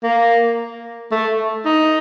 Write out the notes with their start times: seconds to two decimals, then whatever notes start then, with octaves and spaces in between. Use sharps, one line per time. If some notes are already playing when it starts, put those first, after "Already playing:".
0.04 A#3
1.12 A3
1.66 D#4